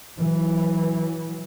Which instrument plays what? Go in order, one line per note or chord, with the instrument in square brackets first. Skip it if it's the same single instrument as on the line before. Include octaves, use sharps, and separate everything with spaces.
[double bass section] E3 F#3